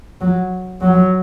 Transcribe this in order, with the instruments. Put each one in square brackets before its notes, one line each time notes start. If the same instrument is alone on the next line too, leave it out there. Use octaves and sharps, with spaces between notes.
[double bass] F#3
F#3